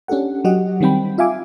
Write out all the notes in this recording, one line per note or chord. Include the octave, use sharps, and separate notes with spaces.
C#4 D4 G4 A4 F#5
F#3 F#4 G4 D#5 F#5
D#3 G3 C4 G5 B5
F4 E5 F5 G#5 D6